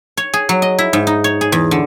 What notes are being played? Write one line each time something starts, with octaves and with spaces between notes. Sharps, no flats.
C#5
G#4
F#3
D#5
E4
G#2
D#4
C#5
G#4
E2
D3